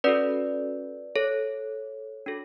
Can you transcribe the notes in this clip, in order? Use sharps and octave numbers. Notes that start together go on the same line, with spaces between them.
C#4 F#4 A4 B4 D5
A4 C#5
D4 F#4 A4